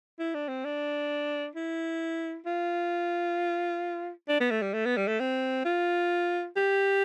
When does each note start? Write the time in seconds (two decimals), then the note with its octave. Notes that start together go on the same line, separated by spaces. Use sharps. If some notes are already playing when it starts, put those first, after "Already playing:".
0.19 E4
0.34 D4
0.49 C4
0.65 D4
1.55 E4
2.46 F4
4.28 D4
4.40 B3
4.51 A3
4.62 G3
4.73 A3
4.85 B3
4.97 G3
5.08 A3
5.20 C4
5.65 F4
6.56 G4